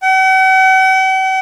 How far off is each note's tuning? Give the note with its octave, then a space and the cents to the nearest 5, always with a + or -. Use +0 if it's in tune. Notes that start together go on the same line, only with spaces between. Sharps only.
F#5 +45